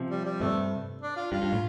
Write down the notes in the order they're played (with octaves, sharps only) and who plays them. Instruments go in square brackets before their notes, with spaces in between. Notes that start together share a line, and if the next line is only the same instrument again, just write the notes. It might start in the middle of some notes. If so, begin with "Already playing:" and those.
Already playing: [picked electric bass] C3 F3
[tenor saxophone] G3
G3
[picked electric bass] G2 C3 [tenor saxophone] A3
[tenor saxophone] D4
F4
[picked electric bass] G2 [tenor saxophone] F4
[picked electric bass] G2
A2